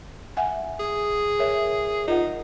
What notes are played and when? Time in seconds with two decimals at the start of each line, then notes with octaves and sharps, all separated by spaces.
0.37 E5 F#5 G#5
0.80 G#4
1.39 A#4 C#5 E5
2.08 D#4 F4 A#4 F#5